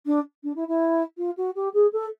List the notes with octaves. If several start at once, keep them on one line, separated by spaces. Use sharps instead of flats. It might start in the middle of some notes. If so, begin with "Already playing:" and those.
D4
D4
E4
E4
F4
F#4
G4
G#4
A4